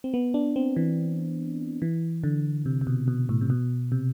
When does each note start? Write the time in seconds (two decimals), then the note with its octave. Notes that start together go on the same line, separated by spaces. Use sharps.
0.04 C4
0.14 B3
0.34 D4
0.56 C4
0.76 E3
1.82 E3
2.24 D3
2.66 C3
2.81 C3
2.87 B2
3.08 B2
3.29 A2
3.41 C3
3.50 B2
3.92 C3